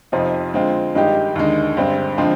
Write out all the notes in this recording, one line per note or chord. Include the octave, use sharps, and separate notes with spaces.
F2 C3 F3 C4 D#4
D3 G#3 C4 F4
G2 D#3 G#3 D#4 G4
D#2 D3 G#3
G2 D3 G#3 C4
D3 F3 G#3 C4